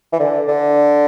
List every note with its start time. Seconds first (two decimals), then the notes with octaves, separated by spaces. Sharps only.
0.13 E3
0.19 D3
0.48 D3